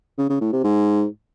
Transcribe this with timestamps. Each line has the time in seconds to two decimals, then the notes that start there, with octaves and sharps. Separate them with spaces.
0.18 C#3
0.29 C#3
0.41 A2
0.52 C3
0.64 G#2